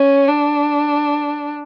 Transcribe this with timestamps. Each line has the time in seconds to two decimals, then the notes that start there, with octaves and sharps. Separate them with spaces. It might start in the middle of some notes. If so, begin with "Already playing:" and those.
Already playing: C#4
0.28 D4